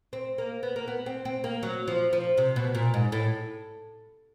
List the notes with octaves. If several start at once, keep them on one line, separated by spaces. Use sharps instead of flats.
C4
A#3
B3
A#3
B3
C4
C4
A#3
F#3
F3
F3
C3
B2
A#2
G#2
A2